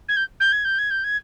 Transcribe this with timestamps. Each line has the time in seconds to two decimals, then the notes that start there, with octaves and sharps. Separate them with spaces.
0.09 G#6
0.17 G6
0.40 G6
0.52 G#6
0.65 G6
0.79 G#6
0.91 G6
1.04 G#6